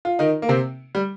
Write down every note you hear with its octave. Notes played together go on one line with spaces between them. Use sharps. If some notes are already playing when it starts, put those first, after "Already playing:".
F4
D#3 D#4
A#3
C3 C4
G3